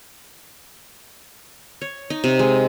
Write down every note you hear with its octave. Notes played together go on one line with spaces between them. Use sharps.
C#5
D#4
C3
G#3